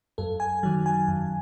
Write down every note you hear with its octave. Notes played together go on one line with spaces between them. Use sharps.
F#2 A4
G#5
D#3 F#3
G#5
F#2